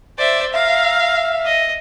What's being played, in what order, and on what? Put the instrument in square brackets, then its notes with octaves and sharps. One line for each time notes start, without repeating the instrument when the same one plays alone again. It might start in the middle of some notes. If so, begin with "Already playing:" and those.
[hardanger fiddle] C5 E5 [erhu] D5
[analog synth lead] E5 [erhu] F5 [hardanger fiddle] A#5
[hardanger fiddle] D#5